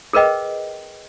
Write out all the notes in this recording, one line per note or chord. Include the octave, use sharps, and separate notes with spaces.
G#4 A#4 B4 D#5 G5